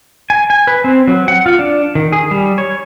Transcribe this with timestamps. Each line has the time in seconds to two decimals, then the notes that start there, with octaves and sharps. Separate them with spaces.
0.30 G#5
0.50 G#5
0.67 B4
0.84 C4
1.08 F#3
1.28 F#5
1.46 F4
1.59 D4
1.95 D#3
2.12 G#4
2.31 G3
2.58 C#5